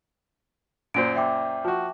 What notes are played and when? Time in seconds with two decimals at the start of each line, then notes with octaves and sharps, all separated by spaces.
0.94 F#2 A#2 C5 D7
1.15 E5 G5 D6
1.65 F3 F#4